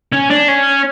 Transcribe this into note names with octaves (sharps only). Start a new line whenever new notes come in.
C#4
D4
C#4